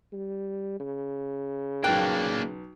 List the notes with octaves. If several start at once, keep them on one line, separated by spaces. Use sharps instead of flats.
G3
C#3
B1 A#3 D4 G5 F#6